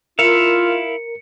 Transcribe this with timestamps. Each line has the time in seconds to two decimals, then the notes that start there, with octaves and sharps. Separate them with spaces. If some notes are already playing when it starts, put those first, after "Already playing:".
0.19 E4 F4 A#4 E5 F5 C#7